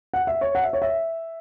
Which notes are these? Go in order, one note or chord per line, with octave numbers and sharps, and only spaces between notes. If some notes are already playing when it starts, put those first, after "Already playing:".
F#5
E5
C#5
F#5
E5
C#5
E5